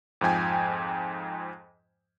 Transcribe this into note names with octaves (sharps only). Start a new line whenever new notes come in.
F2 G#2 F3 G5 G#5